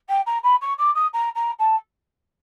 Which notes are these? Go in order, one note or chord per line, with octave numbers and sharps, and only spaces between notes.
G5
A#5
B5
C#6
D6
D#6
A#5
A#5
A5